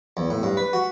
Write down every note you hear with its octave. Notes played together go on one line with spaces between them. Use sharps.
E2
A2
G2
B4
F#4